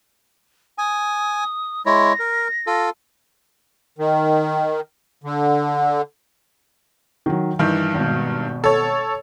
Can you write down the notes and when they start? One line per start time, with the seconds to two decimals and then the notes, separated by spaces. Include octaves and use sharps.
0.78 G#5 D#6
1.86 G#3 E4 C#5 A#6
2.19 A#4
2.67 F4 A4
3.98 D#3
5.24 D3
7.26 D#3 F#3
7.59 G2 D#3 E3
7.94 G#1 B2
8.64 A4 C#5